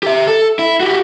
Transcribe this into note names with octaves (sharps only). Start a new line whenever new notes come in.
G4 E5
A4
E4
F#4 G4